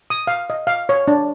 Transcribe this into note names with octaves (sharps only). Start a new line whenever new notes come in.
D#6
F5
D#5
F5
C#5
D4